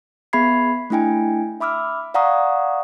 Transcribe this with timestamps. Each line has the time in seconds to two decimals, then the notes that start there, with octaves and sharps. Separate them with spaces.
0.33 B3 G#4 E5 B5 G#6 C7
0.90 A3 D4 E4 G5 G#5
1.61 E5 B5 D6 E6 F6
2.14 D5 F5 F#5 A#5 C#6 D#6